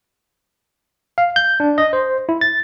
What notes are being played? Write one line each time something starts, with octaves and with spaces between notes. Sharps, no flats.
F5
G6
D4
D#5
C5
E4
A6